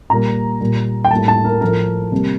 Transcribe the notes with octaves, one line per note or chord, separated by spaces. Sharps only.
A#2 G3 A#3 A#5
A#2 G3 A#3
G5
A2 G3 A#3 A5
A5
A#4
A2 F3 A3 A#4
C3 G3 A#3